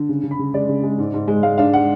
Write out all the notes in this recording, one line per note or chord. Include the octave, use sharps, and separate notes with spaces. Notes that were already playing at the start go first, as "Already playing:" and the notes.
Already playing: D3
C#3
C#3
B5
C#3
G#3 D5
C#3
G#3
G#2
G#2
G#3
G#3 F5
D4 F5
F#5